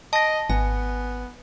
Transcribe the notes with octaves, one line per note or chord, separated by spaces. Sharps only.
D#5 A5 A#6
G#1 B3 G#5